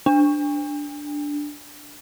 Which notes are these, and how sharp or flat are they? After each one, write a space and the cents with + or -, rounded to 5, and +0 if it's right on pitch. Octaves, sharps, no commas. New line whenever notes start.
D4 +0